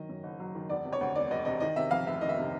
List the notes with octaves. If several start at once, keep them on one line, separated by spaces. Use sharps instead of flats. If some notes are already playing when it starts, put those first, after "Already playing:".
Already playing: D#3 F#3 D#5
F#2
F#1
F#3
D#3
E1 D5
C3
C#5
D2
E1 D5
E1 D#5
C3 D#5
D#3 D#5
C3 E5
F2 F5
F1 E5
D#3 D#5
E5
C3